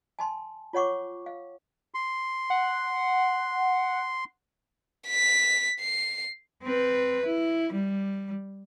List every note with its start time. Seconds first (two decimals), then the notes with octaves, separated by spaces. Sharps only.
0.19 G#5 A5 C6
0.73 F4 C#5 F#5 C#6 D6
1.26 F5
1.94 C6
2.50 F#5
5.07 B6
5.80 C7
6.63 C4 B4
7.26 E4
7.72 G3